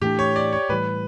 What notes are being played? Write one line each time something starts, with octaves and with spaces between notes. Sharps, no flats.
A2 E3 A3 D4 G4
C#5
D5
C#5
A2 E3 G3 B4